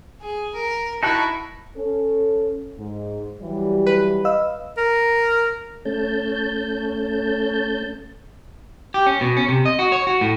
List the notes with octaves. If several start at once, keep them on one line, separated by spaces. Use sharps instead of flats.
G#4
A#4
D#4 E4 F#4 A5 F#6
C#4 A4
G#2
E3 F#3 G3
B4
D#5 F5 E6
A#4
A3 C#4 A5 G6
G4
C#4
B2
C#4
C3
D#5
F#4
C#5
F#4
A2